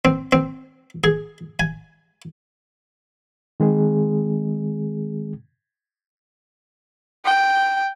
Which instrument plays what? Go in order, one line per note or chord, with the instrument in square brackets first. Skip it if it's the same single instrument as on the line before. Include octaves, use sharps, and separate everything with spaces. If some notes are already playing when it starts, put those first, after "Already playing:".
[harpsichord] C4
C4
G#4
G#5
[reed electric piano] D#3 G#3 C4 G#4
[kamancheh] G5